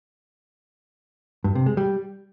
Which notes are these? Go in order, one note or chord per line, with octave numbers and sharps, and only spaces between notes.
G2
C3
G#3
G3